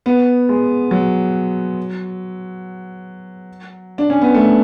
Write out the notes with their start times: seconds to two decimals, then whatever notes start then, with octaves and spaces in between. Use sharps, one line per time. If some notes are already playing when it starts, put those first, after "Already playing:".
0.06 B3
0.49 G#3
0.91 F#3
3.98 D4
4.10 C#4
4.22 B3
4.34 A3